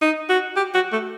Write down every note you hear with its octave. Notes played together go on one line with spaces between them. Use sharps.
D#4
F#4
G4
F#4
A3